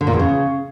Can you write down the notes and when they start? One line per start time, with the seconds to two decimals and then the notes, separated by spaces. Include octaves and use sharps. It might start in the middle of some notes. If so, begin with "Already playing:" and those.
0.01 D3
0.07 A#2
0.13 E2
0.19 C#3